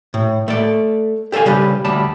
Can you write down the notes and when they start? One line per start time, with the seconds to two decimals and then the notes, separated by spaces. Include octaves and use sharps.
0.14 A2
0.48 A3 A4 D5
1.32 G4 A4 C5 F5 G#5
1.45 C#3 G3 G4 B4
1.85 D2 G3 A5 B5